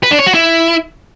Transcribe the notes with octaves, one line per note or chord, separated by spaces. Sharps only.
B4
D4
C#5
F#4
E4